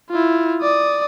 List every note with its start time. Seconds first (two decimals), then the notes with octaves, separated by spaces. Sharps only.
0.11 E4 F4
0.63 D5 D#6